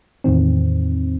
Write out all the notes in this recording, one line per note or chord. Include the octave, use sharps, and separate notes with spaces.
E2 A2 D#3 C4